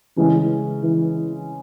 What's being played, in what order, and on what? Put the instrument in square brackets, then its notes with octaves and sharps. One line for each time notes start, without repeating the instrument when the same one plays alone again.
[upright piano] C#3 G#3 C#4 [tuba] E3
[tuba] E3